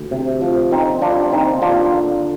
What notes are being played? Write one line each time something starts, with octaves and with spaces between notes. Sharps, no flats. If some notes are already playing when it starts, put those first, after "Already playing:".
Already playing: D2
C3
F3
D3 C4 D#4
G3 D4 F4
D#2 C4 D#4
D#2 D4 F4
D3